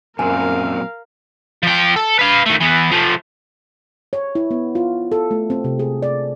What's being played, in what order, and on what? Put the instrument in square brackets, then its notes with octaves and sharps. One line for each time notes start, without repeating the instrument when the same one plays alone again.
[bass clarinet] F#2 [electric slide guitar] A#2 F#3 C4 [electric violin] A#4 F5 [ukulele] G#5
[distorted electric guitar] F3 G5
A4
B4 F5
D#3 A3
E3 B3
F3 A3
[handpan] C#5
E4
B3
F4
A4
A3
C4
C3
G#4
D5